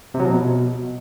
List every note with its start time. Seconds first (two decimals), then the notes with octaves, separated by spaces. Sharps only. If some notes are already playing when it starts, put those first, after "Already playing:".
0.14 C3
0.20 F#3
0.25 F3
0.30 B2